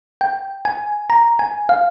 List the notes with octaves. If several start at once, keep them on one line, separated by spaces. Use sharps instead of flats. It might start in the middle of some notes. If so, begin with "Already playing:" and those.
G5
G#5
A#5
G#5
F5